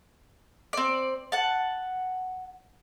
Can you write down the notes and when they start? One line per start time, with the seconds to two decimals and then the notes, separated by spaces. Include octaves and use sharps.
0.73 C4 D5
1.32 F#5 A5